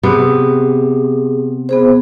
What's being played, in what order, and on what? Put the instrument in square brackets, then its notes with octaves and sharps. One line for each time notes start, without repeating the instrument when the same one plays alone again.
[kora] C3 B3 [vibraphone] G#4
[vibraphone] B3 G#4 C5